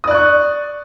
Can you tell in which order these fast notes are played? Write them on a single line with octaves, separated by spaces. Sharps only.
D#6 D5 F#6 C#6